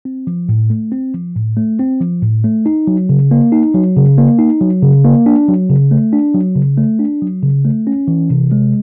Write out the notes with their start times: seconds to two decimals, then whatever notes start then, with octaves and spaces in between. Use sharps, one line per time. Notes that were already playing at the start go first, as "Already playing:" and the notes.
0.05 C4
0.27 F3
0.49 A2
0.70 A3
0.92 C4
1.14 F3
1.36 A2
1.57 A3
1.79 C4
2.01 F3
2.22 A2
2.44 A3
2.66 D#4
2.87 F#3
3.09 C#3
3.31 A#3
3.52 D#4
3.74 F#3
3.96 C#3
4.18 A#3
4.39 D#4
4.61 F#3
4.82 C#3
5.04 A#3
5.26 D4
5.48 F#3
5.70 C#3
5.91 A3
6.13 D4
6.34 F#3
6.56 C#3
6.77 A3
6.99 D4
7.22 F#3
7.43 C#3
7.65 A3
7.87 C#4
8.08 E3
8.30 C3
8.52 G#3